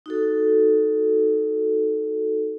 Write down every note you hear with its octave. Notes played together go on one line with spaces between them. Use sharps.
D#4 F#4 A4